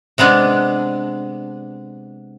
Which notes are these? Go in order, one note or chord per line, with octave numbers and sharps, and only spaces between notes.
C3 G#3 B3 D4